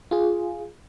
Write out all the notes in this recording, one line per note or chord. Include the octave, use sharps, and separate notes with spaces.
F4 G#4